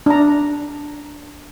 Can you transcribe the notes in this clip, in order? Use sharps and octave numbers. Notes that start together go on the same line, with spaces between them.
D4 A#5